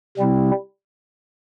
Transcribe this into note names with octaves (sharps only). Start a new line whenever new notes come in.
C3 G3 C4 E4